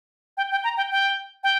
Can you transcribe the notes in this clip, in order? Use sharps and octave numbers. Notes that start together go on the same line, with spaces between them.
G5
G5
A#5
G5
G5
G5